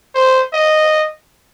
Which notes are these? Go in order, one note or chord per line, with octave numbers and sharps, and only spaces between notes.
C5
D#5